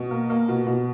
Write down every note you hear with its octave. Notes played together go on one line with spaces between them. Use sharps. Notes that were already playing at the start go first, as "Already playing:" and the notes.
Already playing: B2
A#3
A#3
B2
B2